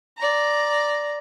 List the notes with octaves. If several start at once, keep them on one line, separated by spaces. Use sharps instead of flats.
D5 A#5